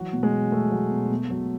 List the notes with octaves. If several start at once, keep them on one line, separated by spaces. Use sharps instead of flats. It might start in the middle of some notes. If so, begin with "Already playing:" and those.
Already playing: E3 F#3 F#4
B2
G#3
B2
B2 A3
F#3
B2
B2
F#3